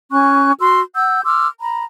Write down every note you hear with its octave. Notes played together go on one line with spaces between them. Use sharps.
C#4 G#5 C#6 F#6
F#4 C6 E6
F#5 E6 G6
C6 D6 E6 F6
A#5 B5